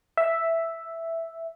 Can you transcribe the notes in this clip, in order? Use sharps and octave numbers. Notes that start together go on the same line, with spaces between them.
E5